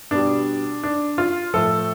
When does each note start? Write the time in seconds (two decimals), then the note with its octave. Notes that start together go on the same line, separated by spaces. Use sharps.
0.11 B2 G3 D4
0.83 D4
1.18 F4
1.54 A2 F3 A4